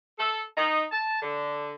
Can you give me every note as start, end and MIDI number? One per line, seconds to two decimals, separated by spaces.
0.18 0.41 69
0.56 0.83 63
0.91 1.21 81
1.22 1.73 50